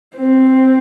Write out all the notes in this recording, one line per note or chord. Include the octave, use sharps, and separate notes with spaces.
C4